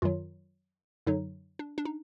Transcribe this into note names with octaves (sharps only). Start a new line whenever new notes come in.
F#2 D#3 F#3 F4
F#2 D3 F#3 D#4
D4
D4
D#4